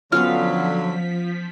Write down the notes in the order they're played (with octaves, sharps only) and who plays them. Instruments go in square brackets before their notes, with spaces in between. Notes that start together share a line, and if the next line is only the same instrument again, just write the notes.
[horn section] D3 F#3 [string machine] F3 B6 [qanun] B3 C#4 F4 [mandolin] F5